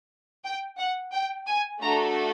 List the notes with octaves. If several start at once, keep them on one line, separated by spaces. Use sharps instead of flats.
G5
F#5
G5
G#5
A3 D4 F#4 A4 A#5